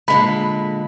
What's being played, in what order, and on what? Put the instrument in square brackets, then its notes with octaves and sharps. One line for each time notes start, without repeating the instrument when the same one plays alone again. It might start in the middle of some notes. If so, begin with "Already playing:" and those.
[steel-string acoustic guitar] A#2 D3 G#3 [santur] B5